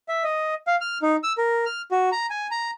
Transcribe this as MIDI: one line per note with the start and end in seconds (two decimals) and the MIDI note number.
0.08 0.23 76
0.24 0.54 75
0.67 0.75 77
0.81 0.98 89
1.02 1.16 63
1.23 1.33 88
1.38 1.65 70
1.66 1.82 89
1.91 2.09 66
2.12 2.26 82
2.30 2.47 80
2.51 2.71 82